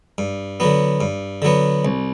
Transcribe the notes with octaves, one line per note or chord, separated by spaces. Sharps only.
G2
D3 F#3 B3
G2
D3 F#3 B3
C2